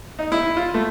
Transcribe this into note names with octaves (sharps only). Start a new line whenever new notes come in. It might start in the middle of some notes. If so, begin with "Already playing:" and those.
D#4
E4
F4
A3